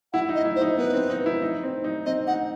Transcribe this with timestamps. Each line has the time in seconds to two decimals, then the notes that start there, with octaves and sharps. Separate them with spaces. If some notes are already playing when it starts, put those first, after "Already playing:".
0.13 E4 F#5
0.29 D#4
0.35 D#5
0.45 E4
0.56 C5
0.62 D#4
0.77 B3 B4
0.94 C4
1.10 D#4
1.26 E4
1.42 D#4
1.63 C4
1.84 D#4
2.06 C4 D#5
2.27 D#4 F#5